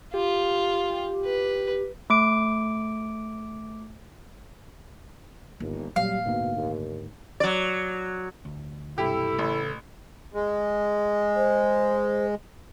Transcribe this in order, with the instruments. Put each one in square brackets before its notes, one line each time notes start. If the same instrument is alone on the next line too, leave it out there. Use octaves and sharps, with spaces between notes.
[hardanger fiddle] F4 [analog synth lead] G4
[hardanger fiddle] B4
[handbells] A3 D6 D7
[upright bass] G1 [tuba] D#2
[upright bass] A#2 [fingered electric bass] F#3 [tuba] G3 [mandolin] F5
[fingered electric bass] D2 G#2 A#3 [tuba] B2
[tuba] D#2
[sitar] F#3 D5
[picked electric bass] D2
[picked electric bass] B1 G2 C3 [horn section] E4 [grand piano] G4 [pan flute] A4
[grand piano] A1 [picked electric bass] C#3 A3
[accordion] G#3
[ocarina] C5